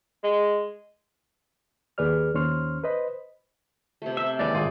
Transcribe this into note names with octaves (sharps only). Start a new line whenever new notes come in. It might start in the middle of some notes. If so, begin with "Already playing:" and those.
G#3
D#2 G#4 B4 D5 F6
D#2 C#4 C5 C6 C#6 F6
B4 C5 D#5 B5
C3 A3
C4 E5
D#2 G#2 E3 D5
G#1 F4 G#4